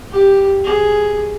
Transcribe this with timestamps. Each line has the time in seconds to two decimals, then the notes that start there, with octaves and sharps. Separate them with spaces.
0.11 G4
0.64 G#4